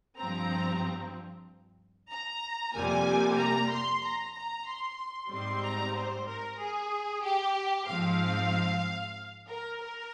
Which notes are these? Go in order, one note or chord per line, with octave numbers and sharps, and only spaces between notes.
G2 F3 C4 A#5
A#5
F2 C3 G3 A#3 G#5
A#5
C6
A#5
A#5
C6
G#2 G3 C4 C6
A#5
C5
A#4
G#4
G4
G#2 F3 C4 F5
A#4
A#4